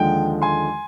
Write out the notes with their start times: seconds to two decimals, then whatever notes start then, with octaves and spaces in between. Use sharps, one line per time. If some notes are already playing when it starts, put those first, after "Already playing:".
Already playing: D#2 D3 F3 G#3 G5
0.42 G#5 C6